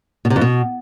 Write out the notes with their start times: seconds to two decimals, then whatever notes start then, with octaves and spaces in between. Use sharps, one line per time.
0.25 B2
0.30 C3
0.36 F2
0.41 B2